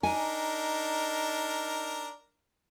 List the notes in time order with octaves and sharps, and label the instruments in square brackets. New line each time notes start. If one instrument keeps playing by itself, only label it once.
[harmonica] D4 A#4 [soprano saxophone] D#4 [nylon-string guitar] G#5